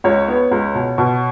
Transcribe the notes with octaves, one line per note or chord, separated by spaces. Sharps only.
C#2 C#5
B3
C#2
B2
B2